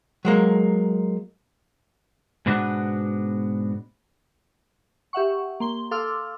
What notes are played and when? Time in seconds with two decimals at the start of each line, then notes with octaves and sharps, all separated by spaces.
0.25 F#3 G#3 A#3
2.46 G#2 B2 B3 D4 F#4
5.13 G4 E5 F#5 C#6
5.60 A#3 C6 G7
5.91 A4 F5 C6 D6 E6 F6